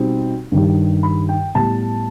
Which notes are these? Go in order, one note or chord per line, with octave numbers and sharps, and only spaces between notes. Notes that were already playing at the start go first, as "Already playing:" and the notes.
Already playing: B2 G3 C4 D#4
G2 D#3 G3
B5
G5
A2 G3 B3 A5